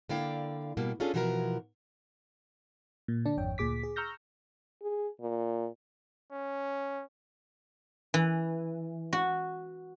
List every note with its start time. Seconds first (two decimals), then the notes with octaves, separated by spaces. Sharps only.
0.09 D3 A#3 E4 D5 F5 G5
0.77 B2 G3 A#3
1.00 C#4 D4 F4 G#4 A4
1.14 B2 E3 F3 F#4 G#4 A#4
3.08 A#2
3.25 D3 D4 D5 A5
3.37 G#1 F2 C#5 G5
3.58 D2 A#2 G#4 D6 B6
3.83 G#4
3.96 A#5 C#6 E6 F6 G6 A#6
4.82 G#4
5.21 A#2
6.31 C#4
8.14 E3
9.13 F#4